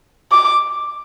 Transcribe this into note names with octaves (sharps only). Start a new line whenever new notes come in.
D6